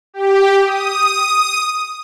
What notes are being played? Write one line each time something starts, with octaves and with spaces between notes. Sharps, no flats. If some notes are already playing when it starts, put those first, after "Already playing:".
G4
D#6